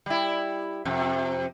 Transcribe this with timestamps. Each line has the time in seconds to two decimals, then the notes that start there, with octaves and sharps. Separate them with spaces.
0.06 G3 E4
0.85 F2 C3